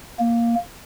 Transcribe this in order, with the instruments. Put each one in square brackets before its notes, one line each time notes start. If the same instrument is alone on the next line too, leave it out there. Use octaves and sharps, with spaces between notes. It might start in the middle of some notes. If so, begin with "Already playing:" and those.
[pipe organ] A#3